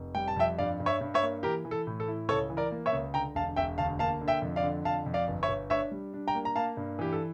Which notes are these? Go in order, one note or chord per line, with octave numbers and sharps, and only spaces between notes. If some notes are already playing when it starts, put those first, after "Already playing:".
Already playing: F1
G3 G5
A5
F2 E5 G5
G2 D5 F5
G2
C#5 E5
G2
C#5 E5
A#3
E3 G4 A#4
E3
A4
A2
A4
E4
C#2 A4 C#5
E3
A#4 D5
A#3
C#5 E5
C#2
D3 G5 A#5
E1 F5 A5
E1 E5 G5
D2 F5 A5
A#3 F5 A5
D3
E5 G5
F2
D5 F5
D3
F2 F5 A5
F2
D5 F5
G1
C#5 E5
G1
D4 C#5 E5
G3
D4
G5 A#5
A#3
A#5
A#3 F5 A5
G2
E3 G4
A4